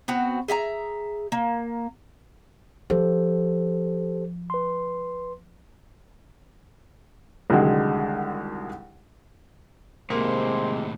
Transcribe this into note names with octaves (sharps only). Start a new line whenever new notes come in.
B3 C4 F#4
G#4 E5 F5 A#5
A#3
F3 G4 A4 C5
B4 C6
C2 D3 D#3 F#3 G#3
D#2 A2 C3 G#3 A#3 C5